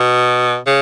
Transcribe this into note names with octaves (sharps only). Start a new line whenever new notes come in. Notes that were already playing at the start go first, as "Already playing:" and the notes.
Already playing: B2
C#3